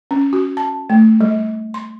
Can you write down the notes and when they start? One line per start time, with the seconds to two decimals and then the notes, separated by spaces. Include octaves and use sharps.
0.11 C#4
0.33 F#4
0.57 A5
0.90 A3
1.21 G3
1.74 C6